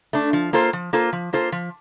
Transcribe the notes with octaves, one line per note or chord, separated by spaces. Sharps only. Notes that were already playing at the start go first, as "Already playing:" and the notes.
A3 D4
F3
A#3 F4 A4 C5
F3
A#3 F4 A4 C5
F3
A#3 F4 A4 C5
F3